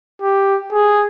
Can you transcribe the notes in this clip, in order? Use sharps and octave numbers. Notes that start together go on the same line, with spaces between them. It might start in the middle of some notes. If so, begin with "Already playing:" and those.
G4
G#4